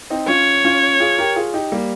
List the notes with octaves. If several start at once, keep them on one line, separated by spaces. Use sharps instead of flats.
C4 D#4
C#4 F4 C#5
C#4 F4
F4 G#4
G4 A#4
F4 G#4
D#4 G4
G3 A#3